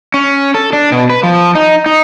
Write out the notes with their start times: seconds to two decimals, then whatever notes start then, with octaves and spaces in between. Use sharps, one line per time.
0.14 C#4
0.54 A4
0.73 D4
0.92 B2
1.10 B4
1.23 F3
1.55 D#4
1.86 D#4